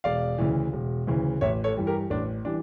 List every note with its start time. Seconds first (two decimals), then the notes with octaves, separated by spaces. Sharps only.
0.04 E1 D5 F5
0.38 D2 C#3 E3
0.73 E1
1.07 D2 C#3 E3
1.41 A1 C#5 E5
1.64 A4 C#5
1.77 G2 E3 G3
1.87 G4 A#4
2.10 A1 D4
2.45 E3 G3 D4